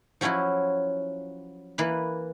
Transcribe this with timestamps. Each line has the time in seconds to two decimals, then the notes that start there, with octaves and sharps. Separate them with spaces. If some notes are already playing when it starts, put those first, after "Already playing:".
0.21 F3 F#3 C#4 E4 F#4
1.78 E3 A#3 B4